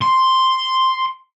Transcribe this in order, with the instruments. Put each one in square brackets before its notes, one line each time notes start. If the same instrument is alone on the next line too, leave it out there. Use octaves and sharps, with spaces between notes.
[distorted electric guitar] C6